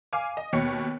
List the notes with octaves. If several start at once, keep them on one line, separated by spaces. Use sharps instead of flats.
F5 G#5 D6
D#5
D#2 B2 C#5 C#7